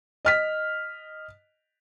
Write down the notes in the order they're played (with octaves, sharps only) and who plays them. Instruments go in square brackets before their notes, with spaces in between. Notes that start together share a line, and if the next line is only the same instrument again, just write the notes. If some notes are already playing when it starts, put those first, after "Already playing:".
[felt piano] D#5 F6 B6